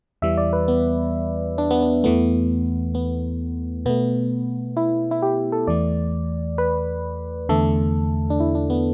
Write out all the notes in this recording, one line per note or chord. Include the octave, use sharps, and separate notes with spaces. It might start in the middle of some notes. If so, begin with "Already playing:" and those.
E2 E3 G3 E5
D5
B4
B3
D4
B3
D4
E2 E3 A3 B3
B3
B2 A3 B3
E4
E4
G4
A4
E2 E3 A3 D5
B4
E2 D3 A3 A4
D4
E4
D4
B3